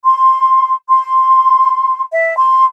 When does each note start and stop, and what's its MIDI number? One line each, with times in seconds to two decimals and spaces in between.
0.04 0.74 84
0.89 2.01 84
2.13 2.36 76
2.37 2.65 84